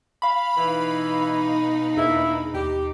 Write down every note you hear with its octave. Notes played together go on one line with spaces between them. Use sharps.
F5 B5
B2 E3 D#4
E2 A#3 D4 E4 G#4
D#2 G4